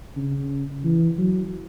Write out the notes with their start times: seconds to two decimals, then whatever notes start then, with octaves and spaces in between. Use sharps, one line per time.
0.17 C#3
0.84 E3
1.18 F#3